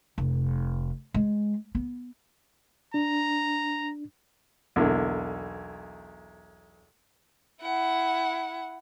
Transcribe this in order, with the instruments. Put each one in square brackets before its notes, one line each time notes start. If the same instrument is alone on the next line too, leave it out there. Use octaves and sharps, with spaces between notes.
[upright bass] F1
G#3
B3
[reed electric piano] D4 [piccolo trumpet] A#5
[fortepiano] B1 E2 D3 A#3
[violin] E4 F#5